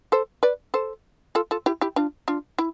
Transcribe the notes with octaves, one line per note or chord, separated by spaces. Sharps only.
A4 C5
B4 D5
A4 C5
F4 A4
F4 A4
E4 G4
E4 G4
D4 F4
D4 F4
E4